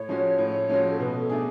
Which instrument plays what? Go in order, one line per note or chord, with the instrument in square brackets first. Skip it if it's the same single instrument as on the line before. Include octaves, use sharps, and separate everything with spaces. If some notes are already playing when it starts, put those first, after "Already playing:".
Already playing: [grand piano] A2 [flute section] C#5
[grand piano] F3 G#3 C#4 F#4
A2
F3 G#3 C#4 F#4
[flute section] A4
[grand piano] B2 [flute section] B4
[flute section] A4
[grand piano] A3 D4 G#4